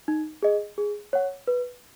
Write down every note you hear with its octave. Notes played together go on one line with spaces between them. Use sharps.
D#4
G#4 D#5
G#4
C#5 F#5
B4